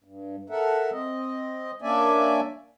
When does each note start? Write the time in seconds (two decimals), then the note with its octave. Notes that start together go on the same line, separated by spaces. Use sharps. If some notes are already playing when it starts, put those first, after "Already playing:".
0.04 G2
0.50 A4 A#4 E5 F#5
0.92 C4 D#5
1.82 A#3 C#4 D4 D5 E5 G#5